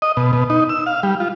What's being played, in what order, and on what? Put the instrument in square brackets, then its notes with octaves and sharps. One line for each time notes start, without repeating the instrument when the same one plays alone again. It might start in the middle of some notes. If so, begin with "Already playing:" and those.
[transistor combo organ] D#5
B2
B2
D#4
E6
F5
G3
F4